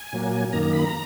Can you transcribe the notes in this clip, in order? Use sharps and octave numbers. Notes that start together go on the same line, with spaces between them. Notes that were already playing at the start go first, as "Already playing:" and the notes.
Already playing: G#5
A#2 F#3 A#3
F#2 D#3 A#3 A#5
A#5
B5
A#5